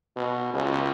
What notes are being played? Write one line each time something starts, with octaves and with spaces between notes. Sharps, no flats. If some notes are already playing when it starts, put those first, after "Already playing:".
B2
C#2